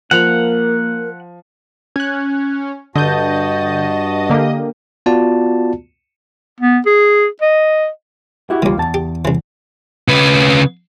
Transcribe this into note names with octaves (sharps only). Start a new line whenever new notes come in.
F3 A#3 A#4 F#5 F7
C#4 F#6 G#6
G2 D3 F#4 D#5 A5 G6
D3 A#3 G4
B3 F4 F#4 D5 A5
B3
G#4
D#5
E4 F#4 G4
D#2 D#3 G3 A#3 F4
E2 A5
G4
C2 E3
C#3 B4